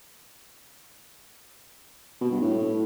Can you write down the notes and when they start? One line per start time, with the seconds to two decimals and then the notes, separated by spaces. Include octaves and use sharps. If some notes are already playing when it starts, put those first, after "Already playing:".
2.21 B2
2.31 G2
2.42 A2